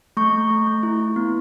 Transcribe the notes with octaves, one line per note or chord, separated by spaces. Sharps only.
A3 C#6
A3
A3
A3
E4
E4
B3